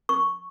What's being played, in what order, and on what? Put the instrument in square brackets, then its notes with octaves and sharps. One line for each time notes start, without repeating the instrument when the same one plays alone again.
[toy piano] C#6